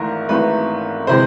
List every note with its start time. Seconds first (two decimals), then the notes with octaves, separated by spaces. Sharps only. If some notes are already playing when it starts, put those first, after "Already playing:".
Already playing: G#1 G#2 E3 A3 A#4
0.29 G#1 G#2 E3 A3 B4
1.07 C3 E3 G#3 C5